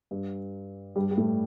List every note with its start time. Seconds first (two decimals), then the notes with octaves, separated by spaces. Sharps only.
0.11 G2 G3
0.96 G2 G3
1.11 G3
1.17 A2 A3